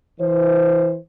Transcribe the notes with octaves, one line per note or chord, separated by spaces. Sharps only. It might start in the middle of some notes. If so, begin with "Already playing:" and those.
E3 C5